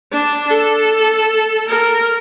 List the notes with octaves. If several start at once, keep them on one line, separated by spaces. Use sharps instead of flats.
D4
A4
A#4